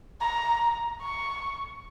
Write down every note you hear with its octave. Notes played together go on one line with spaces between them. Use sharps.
A#5
C#6